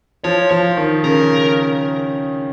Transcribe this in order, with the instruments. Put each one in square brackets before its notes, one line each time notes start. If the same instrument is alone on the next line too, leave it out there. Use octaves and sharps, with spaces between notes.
[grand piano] F3 [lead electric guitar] C#5
[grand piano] F3
D#3
[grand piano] C#3 [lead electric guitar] A#4